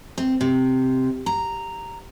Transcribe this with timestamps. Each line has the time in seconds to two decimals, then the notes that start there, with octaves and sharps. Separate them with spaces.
0.18 C4
0.41 C3
1.26 A#5